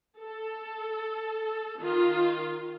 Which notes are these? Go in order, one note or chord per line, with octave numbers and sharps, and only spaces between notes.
A4
D#3 F4